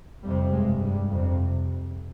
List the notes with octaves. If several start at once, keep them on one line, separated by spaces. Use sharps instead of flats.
F2 C3 G3
G2 G#3
G2 G3
F2 C3